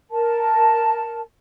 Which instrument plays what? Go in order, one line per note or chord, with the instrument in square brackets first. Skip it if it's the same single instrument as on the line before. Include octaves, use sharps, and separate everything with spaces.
[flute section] A#4 A5